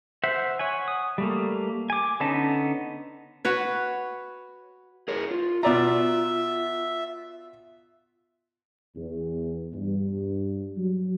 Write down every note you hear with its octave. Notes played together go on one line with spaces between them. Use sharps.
C5 E5 F#5
C#5 F#5 G#5
D#6
G3 A3 A#3
G#5 D6
D3 B3 C#4 D#4 A5
F#4 B4 C#5
G#4 A#4 C#5
F4
B2 F4 D5 E5 A#5
E2
G2
F#3